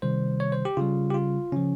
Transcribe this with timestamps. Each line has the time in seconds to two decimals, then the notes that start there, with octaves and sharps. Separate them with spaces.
0.02 C3 D#3 G3 C5
0.40 C#5
0.52 C5
0.65 G4
0.77 C#3 G3 F4
1.10 G4
1.14 F4
1.52 C#3 F3 C#4